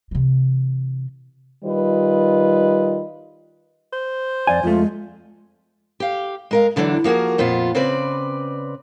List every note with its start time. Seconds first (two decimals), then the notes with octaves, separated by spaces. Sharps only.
0.11 C3 E3
1.65 D#3 G3 F4 B4 D#5
3.93 C5
4.47 F2 D5 F5 G#5
4.63 F2 G#3 A3 F4
6.00 G4 F5
6.51 G#3 A#4 F5
6.76 E2 D3 E3 F#3 D4
7.04 F3 A#3 F#4 G#4 A#4
7.38 F2 A#2 B3 F4
7.75 C#3 C4 B4 D5